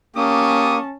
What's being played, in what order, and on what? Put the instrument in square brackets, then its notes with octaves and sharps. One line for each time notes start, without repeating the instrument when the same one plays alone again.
[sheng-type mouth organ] A#3 [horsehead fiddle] C#4 A5 [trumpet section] G4 C#6 D#6